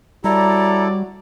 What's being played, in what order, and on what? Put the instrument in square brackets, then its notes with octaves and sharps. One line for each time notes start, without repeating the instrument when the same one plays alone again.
[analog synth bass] G3 [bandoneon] E4 A4 [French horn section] F#4 C#5 D5 [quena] A#5